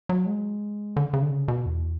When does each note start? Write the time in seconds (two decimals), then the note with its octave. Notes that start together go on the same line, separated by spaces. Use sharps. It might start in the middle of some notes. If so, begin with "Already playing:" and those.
0.09 F#3
0.26 G#3
0.96 D3
1.13 C#3
1.22 D3
1.31 C#3
1.48 B2
1.66 E2